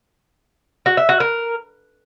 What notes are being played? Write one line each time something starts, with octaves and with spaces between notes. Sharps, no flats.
F#4
E5
F#4
A#4